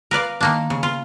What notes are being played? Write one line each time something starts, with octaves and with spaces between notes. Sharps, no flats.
A#4 B4 D5 F5
D#3 A#3 D4
C#3
F4